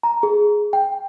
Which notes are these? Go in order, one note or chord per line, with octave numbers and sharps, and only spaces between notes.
A#5
G#4
G5